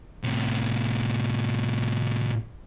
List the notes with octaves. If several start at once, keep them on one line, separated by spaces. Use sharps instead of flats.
A2 C3